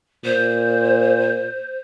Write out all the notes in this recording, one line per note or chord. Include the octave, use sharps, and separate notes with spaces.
A#2 C5